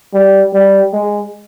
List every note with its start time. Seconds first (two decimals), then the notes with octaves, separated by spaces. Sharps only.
0.14 G3
0.53 G3
0.93 G#3